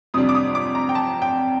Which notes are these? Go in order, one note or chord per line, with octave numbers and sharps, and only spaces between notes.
F2 C3 G3 D4 D#6
D6
D#6
D6
A#5
G5
A5
G5